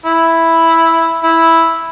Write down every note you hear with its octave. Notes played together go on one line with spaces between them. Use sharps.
E4
E4